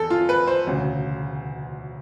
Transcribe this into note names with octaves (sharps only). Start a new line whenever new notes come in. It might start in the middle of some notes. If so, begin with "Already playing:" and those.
Already playing: E2 A4
F4
B4
C5
E1 D2 C#3